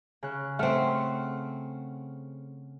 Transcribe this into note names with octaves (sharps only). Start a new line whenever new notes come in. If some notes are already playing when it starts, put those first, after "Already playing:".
C#3 F#6
A3 C4 F#5 F6